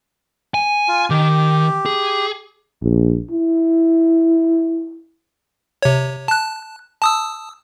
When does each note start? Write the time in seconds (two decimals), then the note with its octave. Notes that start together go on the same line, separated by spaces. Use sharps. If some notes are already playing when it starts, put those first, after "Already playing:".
0.54 G#5
0.88 F4
1.10 D#3 G4
1.86 G#4
2.81 A#1
3.31 E4
5.82 C3 C#5
6.28 A5 F#6
7.02 A5 D#6 E6